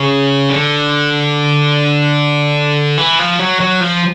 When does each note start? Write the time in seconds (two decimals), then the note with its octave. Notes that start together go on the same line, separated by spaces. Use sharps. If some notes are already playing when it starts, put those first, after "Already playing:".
Already playing: C#3
0.50 D3
2.98 E3
3.19 F3
3.39 F#3
3.60 F#3
3.81 F3